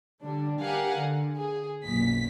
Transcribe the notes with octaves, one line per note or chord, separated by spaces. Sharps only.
D3 G3 D4
G4 A#4 F5 F#5 G#5
D3
G#4
B1 F#2 A#2 B6